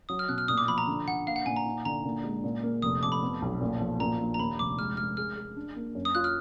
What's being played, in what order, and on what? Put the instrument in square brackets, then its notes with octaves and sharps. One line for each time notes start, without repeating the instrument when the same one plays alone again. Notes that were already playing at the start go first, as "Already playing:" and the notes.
[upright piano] F#3 [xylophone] D#6
[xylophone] F6
[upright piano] B2 [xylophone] F#6
[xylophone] F6
[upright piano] A#2 [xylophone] D#6
[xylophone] D6
[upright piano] F3 [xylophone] B5
[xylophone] A#5
[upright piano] D3
[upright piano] D3 [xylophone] F#5
[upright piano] A#3 [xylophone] F5
[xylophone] F#5
[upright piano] A#2 [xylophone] G#5
[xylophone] A#5
[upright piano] D#4
[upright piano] D3 [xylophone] A#5
[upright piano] A#2
G#3
A#2
A#3
[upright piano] F1 [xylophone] D#6
[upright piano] F2 [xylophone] D6
[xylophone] B5
[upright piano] B3
B1
A#2
F3
[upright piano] A#2 [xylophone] A#5
[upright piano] A#1
[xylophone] A#5
[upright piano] D#2 [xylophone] B5
[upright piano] F1 [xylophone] D6
[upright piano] G#3 [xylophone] F6
[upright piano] G#3 [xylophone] F6
[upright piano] G#4 [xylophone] F6
[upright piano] G#4
D4
A#3
F#2
[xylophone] D#6
[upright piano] F4 [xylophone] F#6
[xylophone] F6